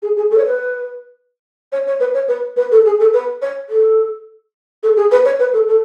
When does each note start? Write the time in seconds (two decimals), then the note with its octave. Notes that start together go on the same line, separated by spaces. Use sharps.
0.02 G#4
0.16 G#4
0.31 A4
0.38 C#5
0.46 B4
1.72 C#5
1.87 C#5
2.00 B4
2.14 C#5
2.28 B4
2.56 B4
2.71 A4
2.85 G#4
3.00 A4
3.13 B4
3.42 C#5
3.69 A4
4.83 A4
4.97 G#4
5.11 B4
5.25 C#5
5.39 B4
5.53 A4
5.68 A4